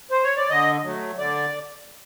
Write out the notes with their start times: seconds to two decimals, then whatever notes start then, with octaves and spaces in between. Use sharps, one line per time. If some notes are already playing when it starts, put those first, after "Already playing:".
0.10 C5
0.24 C#5
0.37 D5
0.50 D3 D#5
0.84 F#3 A3
1.18 D3 D5